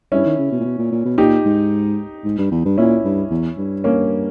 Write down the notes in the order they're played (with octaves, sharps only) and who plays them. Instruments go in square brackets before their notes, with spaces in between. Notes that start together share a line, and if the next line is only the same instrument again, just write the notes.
[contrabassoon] G2 [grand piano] C#4 E4
[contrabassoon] D#3
C#3
B2
A#2
B2
A#2
A#2
B2
[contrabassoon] A#2 [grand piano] D#4 G4
[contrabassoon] G#2
G#2
G2
E2
G2
[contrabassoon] A#2 [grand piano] C#4 E4
[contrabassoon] G2
E2
G2
[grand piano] A#3 C#4